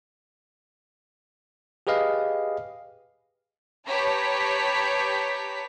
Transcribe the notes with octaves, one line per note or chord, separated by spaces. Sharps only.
G4 G#4 B4 D#5 F5
G4 B4 C#5 A5 A#5 B6